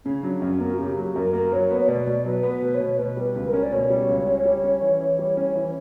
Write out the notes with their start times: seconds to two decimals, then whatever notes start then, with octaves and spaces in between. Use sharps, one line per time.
0.05 C#3 C#4
0.23 F#3 D4
0.42 F#2 C#4
0.60 A#3 B3
0.73 F#4
0.79 C#3 G4
0.97 F#3 G4
1.15 F#2 A#4
1.33 A#3 A#4
1.52 F#3 C#5
1.71 B3
1.81 C#5
1.88 B2 D5
2.07 B2
2.25 F#3 B4
2.43 B3
2.50 B4
2.62 B2
2.75 C#5
2.80 B2
2.99 B2 B4
3.17 G3
3.24 B4
3.35 C#2
3.48 A#4
3.54 C#4
3.63 D5
3.72 B2 C#5
3.90 G3
4.09 C#2
4.27 C#4
4.45 G3
4.64 C#4
4.82 E3
5.01 E3
5.19 G3
5.37 C#4
5.55 E3